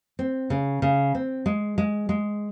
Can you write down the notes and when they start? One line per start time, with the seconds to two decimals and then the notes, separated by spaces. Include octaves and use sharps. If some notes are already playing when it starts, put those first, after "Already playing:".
0.19 C4
0.50 C#3
0.82 C#3
1.15 C4
1.46 G#3
1.78 G#3
2.09 G#3